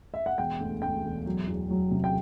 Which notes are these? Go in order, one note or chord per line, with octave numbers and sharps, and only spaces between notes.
E5
F#5
E1 G5
D2
D2 G5
E1
F#3
E2
F#3
C3
G5